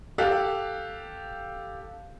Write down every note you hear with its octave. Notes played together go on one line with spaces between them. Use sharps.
G4 A4 F5 F#6